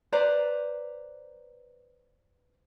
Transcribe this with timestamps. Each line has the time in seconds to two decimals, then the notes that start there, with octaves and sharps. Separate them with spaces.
0.12 B4 C5 D5 A#5